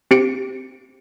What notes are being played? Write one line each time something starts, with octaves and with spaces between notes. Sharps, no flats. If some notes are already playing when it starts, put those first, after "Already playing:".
C4 G4 C#7 D7